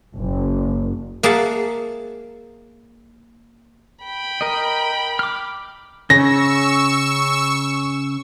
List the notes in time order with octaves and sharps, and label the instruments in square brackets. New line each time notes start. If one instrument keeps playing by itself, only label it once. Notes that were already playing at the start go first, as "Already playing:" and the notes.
[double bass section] F#1
[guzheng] A#3 G#4 E5 F#5 A5
[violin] G5 B5
[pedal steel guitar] A#4 D#5
D6 F6
[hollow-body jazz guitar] C#3 [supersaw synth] C#6 E6 [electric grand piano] A#6